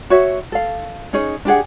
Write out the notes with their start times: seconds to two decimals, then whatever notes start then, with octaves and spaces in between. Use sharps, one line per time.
0.10 F#4 C#5 E5
0.52 A4 F5
1.13 C#4 D#4 G#4 C#5
1.45 D4 G4 G#4 F#5